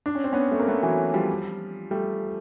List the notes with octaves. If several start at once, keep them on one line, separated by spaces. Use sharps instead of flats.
D4
C#4
C4
B3 C#4
A3
A#3
A3 B3
E3 F#3
F3 G3
G3 A3